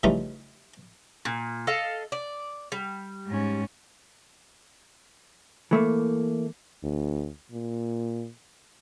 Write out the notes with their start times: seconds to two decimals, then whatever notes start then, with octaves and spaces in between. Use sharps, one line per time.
0.03 C#3 E3 G3 A3 D#4 F4
1.25 A#2
1.67 A4 D#5 F5
2.12 D5
2.72 G3
3.28 G#2 C#4
5.71 E3 A3 A#3
6.83 D2
7.52 A#2